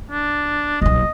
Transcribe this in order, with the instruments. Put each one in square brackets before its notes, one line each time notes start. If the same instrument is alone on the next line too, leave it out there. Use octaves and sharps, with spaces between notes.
[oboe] D4
[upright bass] D#1 B1 [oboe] D#5